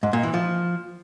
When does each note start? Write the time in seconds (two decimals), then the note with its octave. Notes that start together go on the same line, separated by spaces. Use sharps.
0.03 G#2
0.13 A#2
0.23 E3
0.34 F3